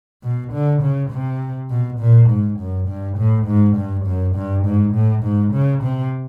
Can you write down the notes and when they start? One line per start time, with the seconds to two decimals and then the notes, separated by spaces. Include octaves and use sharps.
0.23 B2
0.53 D3
0.82 C#3
1.11 C3
1.70 B2
2.00 A#2
2.29 G#2
2.59 F#2
2.88 G2
3.18 A2
3.47 G#2
3.76 G2
4.06 F#2
4.36 G2
4.64 G#2
4.94 A2
5.23 G#2
5.53 C#3
5.83 C3